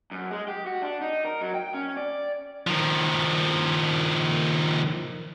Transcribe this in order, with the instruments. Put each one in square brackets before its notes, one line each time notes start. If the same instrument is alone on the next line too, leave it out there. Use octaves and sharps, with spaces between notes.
[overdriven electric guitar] F#2
G#3
G4
F#4
D4
D#4
A#4
F#3
G5
C#4
D5
[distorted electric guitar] D#3 F3